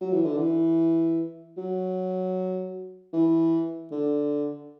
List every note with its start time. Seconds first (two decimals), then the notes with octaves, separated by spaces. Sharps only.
0.01 F#3
0.13 E3
0.25 D3
0.37 E3
1.57 F#3
3.13 E3
3.91 D3